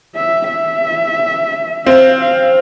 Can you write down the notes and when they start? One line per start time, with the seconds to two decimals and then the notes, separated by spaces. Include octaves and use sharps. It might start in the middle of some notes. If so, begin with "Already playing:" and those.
0.15 E5
0.49 E5
1.86 C4 F5
2.20 F5